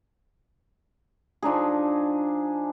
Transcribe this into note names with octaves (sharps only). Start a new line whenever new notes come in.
F3 D4 D#4 G#4